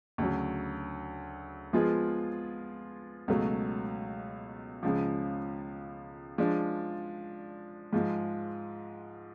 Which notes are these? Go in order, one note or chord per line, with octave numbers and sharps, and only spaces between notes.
D2 C#3 F#3
F3 G#3 B3 F4 G#4
C#2 B2 F#3 A3
C#2 C#3 F3
F3 G#3 D4
G#2 F3 G#3